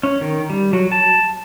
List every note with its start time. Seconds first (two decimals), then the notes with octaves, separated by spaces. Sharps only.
0.03 C#4
0.21 D#3
0.50 G3
0.73 F#3
0.92 A5